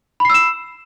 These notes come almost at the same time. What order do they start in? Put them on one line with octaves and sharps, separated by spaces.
B5 C7 E6 E7